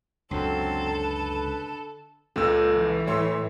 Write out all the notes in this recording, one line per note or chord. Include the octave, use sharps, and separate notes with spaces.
C#2 F#2 D3 F#3 C4 A4 C6
B4
C#2 A#2 A4 E6
E3
A2 A3 C#5 C6 E6